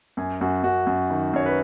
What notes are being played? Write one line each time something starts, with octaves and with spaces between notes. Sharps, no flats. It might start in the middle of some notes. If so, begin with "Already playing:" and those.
F#2 G#5
F#2 F#4
F#2 F#4
F#2
D#3
F#2 C#5
B4